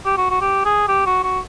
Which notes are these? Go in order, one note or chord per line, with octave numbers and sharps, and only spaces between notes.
G4
F#4
F#4
G4
G#4
G4
F#4
F#4